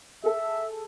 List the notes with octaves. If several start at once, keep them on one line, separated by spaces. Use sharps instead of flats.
G#4 A4 E5